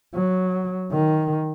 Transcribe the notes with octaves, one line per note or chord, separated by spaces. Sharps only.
F#3
D#3